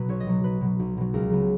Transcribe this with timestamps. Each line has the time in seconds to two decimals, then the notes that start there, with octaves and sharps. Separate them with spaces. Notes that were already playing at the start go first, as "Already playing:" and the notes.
Already playing: B2 F#3 B4
0.09 B1 C#5
0.20 D#5
0.27 B2 F#3
0.44 B1 B4
0.61 B2 F#3
0.79 B1
0.97 B2 F#3
1.14 C#2 A#4
1.30 C#3 F#3 B3